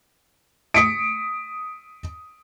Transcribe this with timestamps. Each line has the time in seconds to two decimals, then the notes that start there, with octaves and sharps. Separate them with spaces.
0.74 D#6 B6 C#7 D7